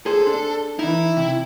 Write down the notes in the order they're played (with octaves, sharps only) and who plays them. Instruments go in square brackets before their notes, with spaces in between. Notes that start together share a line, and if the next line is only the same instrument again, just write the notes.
[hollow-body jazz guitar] G#4 C5 [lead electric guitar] A4
[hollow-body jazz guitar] D4
[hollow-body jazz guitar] E3 D#4 [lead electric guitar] E4
[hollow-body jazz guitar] C3